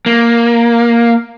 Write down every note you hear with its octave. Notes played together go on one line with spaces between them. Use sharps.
A#3